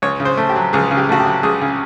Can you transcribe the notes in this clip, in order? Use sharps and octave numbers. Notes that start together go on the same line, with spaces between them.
C#2 C#5
C#3
C5
A3
G4
F#3
C#2 G#4
C#3
G4
A3 F#4
G4
F#3
C#2 G#4
C#3